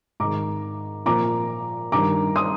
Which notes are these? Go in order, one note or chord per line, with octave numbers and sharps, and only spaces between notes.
G#2 D#3 A#5 D6
A#2 F3 A#5 D6
G2 D#3 A#5 D6
C6 D#6